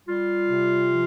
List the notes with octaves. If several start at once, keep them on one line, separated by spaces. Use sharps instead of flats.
G3 F4
C3
F3